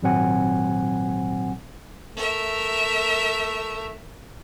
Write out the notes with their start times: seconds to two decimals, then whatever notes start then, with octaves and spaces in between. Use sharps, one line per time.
0.03 G#1 A#2 F#3 C4 F#5 G#5
2.17 A3 A#4 E5